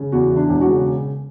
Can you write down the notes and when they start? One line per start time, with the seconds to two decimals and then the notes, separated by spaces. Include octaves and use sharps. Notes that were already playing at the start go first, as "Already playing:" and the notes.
Already playing: C#3
0.12 E2 F#4
0.31 E3
0.36 D4
0.49 E1
0.61 F#4
0.67 C#3